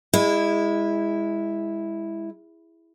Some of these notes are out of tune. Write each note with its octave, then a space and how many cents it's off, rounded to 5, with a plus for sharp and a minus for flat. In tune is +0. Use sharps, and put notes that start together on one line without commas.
G#3 -25 E4 +0